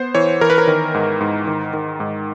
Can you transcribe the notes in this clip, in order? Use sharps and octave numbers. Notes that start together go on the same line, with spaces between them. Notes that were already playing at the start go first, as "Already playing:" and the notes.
Already playing: B3 C5
E3 C#5
E3 A#4
B4
A#4
D#3
G#2
G#2
D#3
D#3
G#2